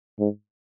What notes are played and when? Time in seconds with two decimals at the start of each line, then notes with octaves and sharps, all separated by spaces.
0.19 G#2